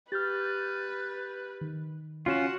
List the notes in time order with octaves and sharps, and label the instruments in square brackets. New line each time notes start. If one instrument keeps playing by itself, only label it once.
[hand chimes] G4 [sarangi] B4 [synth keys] F6 G6 A6
[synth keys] D#3
[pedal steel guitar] C#4 F4 [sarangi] F#4 [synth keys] F6 E7